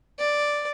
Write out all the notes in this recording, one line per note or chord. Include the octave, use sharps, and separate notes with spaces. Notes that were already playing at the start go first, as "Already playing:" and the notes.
D5